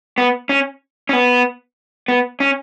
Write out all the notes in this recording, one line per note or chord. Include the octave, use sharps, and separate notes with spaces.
B3
C#4
C#4
B3
B3
C#4